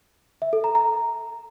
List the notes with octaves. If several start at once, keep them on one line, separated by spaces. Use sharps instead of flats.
E5
A4
A#5
A#5